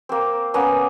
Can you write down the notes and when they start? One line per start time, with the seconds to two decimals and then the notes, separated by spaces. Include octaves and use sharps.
0.09 A#3 C4
0.54 A#3 B3 C#4 D#6